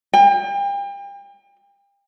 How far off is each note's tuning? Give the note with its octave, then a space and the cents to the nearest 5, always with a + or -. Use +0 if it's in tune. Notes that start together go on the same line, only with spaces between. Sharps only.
G5 +35